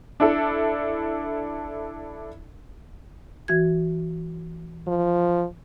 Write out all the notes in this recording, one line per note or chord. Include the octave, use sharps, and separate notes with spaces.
D4 E4 A4
E3 F#4 G#6
F3